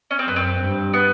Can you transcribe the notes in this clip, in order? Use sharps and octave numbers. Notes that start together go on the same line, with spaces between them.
C#4
C4
F#2 B3
C4
G2
B3